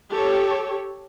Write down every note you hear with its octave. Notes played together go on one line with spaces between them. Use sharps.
G4 A4 C#5